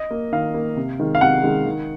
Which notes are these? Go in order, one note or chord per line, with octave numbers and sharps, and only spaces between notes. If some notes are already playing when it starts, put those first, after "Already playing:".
Already playing: D#5
A#3
D#3 F5
A#3
C3
D#3 G#3
F5
C3 F#5
D#3 G#3
D#3